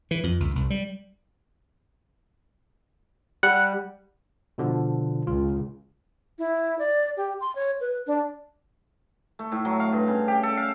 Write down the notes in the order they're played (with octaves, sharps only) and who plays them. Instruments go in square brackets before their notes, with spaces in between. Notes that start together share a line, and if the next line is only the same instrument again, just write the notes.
[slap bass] E3
F2
C#2
C2
G3
[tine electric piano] G3 [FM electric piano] F#5
[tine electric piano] B2 D3 F3
[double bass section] C#2 [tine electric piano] F4
[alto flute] E4
D5
G4
C6
C#5
B4
D4
[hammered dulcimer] A3
A2
F#3
F5
G2
C#3
G4
A4
F5